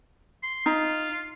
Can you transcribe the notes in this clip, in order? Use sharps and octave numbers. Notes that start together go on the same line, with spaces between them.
C6
D#4 F4